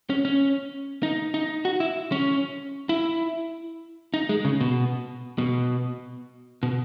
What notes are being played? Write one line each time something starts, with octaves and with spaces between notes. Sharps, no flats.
C#4
C#4
D#4
D#4
F#4
E4
C#4
E4
D#4
G#3
C#3
B2
B2
B2